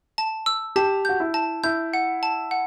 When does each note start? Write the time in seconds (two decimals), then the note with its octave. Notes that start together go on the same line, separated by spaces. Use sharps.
0.18 A5
0.46 E6
0.76 G4 A5
1.05 F#4 G6
1.20 E4
1.34 A5
1.64 E4 G6
1.94 F#5
2.23 A5
2.51 F#5